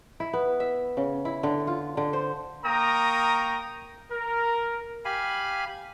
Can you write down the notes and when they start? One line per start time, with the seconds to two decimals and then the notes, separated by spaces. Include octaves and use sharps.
0.20 E4
0.33 B3
0.60 E5
0.97 C#3
1.25 E4
1.43 D3
1.67 F4
1.97 D3
2.13 C5
2.65 A#3 A#4 G5 A#5 C#6 D#6
4.12 A#4
5.05 G4 F5 G#5 B5